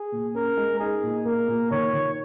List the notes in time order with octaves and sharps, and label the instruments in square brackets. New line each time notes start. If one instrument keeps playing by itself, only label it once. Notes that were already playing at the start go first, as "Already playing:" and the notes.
Already playing: [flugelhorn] G#4
[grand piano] A#2
[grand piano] C#4 [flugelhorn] A#4
[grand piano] G#3
[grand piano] D#4 [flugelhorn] G#4
[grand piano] A#2
[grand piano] A#3 [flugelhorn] A#4
[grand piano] A#2
[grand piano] D#3 [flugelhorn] C#5
[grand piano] D#3